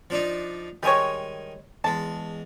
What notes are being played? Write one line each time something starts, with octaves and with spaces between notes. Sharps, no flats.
F3 D4 D#4
D#3 G3 G#3 C#5 G#5
E2 G#3 A5